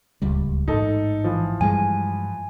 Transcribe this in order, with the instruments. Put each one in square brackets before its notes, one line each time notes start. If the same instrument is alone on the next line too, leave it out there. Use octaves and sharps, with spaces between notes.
[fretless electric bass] D1 C#2 G3
[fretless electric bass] A1 G#2 [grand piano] D#4 A4
[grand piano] E3 F3
[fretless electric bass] G2 G3 G#3 [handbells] G#5